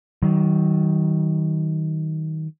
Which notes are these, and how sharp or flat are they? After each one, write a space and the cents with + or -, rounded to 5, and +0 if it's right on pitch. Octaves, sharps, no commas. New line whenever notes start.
D#3 +20 F#3 +45